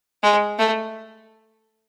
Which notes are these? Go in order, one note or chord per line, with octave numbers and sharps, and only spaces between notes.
G#3
A3